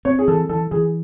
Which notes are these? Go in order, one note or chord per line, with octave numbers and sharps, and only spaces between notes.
C4 C#5
G#4
E3 A4
E3 A4
E3 G#4